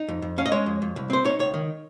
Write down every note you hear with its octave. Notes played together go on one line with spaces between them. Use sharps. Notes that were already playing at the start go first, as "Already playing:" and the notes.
Already playing: D#4
F2
F2
C#4 F5
D#5
G#3 C#5
F2
F2
C2
C4 C5
D#4 C#5
C#2 C#5
D#3